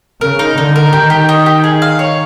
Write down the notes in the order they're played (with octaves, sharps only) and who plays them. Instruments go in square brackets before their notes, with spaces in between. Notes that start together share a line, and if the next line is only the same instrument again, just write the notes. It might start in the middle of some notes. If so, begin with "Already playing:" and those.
[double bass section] C#3 [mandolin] A#4
[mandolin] D#4
[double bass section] D3 [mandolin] D#4
[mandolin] A#4
[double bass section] D#3 [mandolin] G4
[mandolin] G4
D#4
G4
G#4
F5
C#5